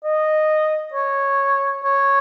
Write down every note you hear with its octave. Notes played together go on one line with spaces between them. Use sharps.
D#5
C#5
C#5